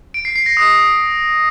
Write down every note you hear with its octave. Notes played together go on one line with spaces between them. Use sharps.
D7
C7
C7
A#6
D#6